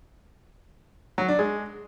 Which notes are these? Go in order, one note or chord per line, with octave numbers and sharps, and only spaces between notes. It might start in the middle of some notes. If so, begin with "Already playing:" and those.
F#3
D4
G#3